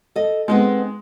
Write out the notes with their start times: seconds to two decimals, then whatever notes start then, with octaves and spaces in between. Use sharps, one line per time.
0.16 A4 D#5
0.48 G#3 B3 C4 D#4